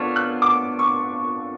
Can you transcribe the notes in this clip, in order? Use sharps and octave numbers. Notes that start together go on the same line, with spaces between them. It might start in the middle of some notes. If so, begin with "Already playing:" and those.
Already playing: B3 D4 F4 A4 C#5 C#6 F6
F#6
D6
C#6